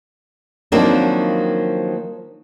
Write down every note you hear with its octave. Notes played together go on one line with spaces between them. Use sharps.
D#3 F3 F#3 A#3 C4 D4